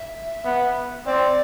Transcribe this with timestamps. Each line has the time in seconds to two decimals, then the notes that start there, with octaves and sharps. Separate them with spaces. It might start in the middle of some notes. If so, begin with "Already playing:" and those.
Already playing: E5
0.45 B3
1.06 C4 D5